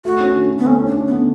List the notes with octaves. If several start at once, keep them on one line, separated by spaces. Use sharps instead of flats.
A3 F#4
C#4
D3
D3
B3
A3 C#4
C#4 D4
C#4
B3
D3